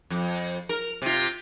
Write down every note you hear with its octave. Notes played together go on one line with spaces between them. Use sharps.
F2
A#4
C3 F4